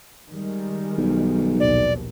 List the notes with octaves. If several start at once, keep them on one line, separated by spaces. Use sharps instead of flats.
D#3 G3 G#3
B1
A#1 D#2 B2 D5